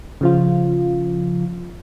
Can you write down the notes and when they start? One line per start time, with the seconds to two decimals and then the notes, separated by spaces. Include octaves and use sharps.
0.21 C#3 F3 F4